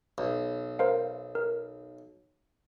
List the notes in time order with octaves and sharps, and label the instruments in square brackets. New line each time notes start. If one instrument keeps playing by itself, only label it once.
[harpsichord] B1
[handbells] A#4 C5 F5
A#4